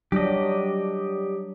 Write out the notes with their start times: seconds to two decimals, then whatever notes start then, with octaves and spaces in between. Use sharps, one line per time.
0.12 F#3 G3 D4 G4 D#5